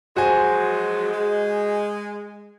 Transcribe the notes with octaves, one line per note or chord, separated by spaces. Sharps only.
F3 F#3 G#3 F#4 C5 G#5
G#3